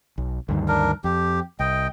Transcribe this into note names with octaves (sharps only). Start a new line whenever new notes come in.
B1
D2 G2 D#3
D4 A#4
F2 G4
C2 D#5 G5